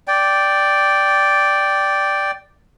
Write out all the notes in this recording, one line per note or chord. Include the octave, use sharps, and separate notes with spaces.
D5 G5